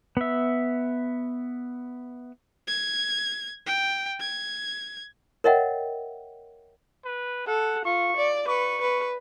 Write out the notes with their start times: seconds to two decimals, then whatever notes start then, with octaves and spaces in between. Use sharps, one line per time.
0.17 B3 E5
2.68 G#6
3.66 G5
4.20 G#6
5.44 A#4 C#5 D#5 E5 F#5 G5
7.05 B4
7.47 A4 F#5
7.85 F4 C#6
8.16 D5
8.48 B4 C#6
8.82 B4